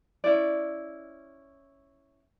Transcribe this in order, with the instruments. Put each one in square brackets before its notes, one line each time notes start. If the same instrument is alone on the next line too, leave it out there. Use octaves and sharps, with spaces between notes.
[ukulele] C#4 E4 F#4 D5